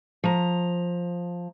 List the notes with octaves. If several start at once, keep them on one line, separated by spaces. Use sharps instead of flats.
F3 A#5